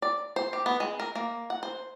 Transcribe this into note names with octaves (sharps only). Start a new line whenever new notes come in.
D5
C5
G4
B3
G#3
A#4
A#3
F#5
C5